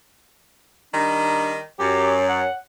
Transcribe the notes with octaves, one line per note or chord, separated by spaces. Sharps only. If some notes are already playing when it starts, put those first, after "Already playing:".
D#3 G3 D4 D#4
F#2 G4 C#5
F#5